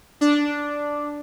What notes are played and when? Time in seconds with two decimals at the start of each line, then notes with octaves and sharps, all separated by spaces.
0.21 D4